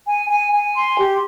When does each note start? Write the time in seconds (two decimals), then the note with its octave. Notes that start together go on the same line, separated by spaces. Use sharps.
0.06 G#5
0.29 G#5
0.51 G#5
0.74 C6
0.97 G4